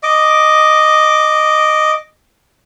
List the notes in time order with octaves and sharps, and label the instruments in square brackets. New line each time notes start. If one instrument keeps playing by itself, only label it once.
[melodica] D#5 D6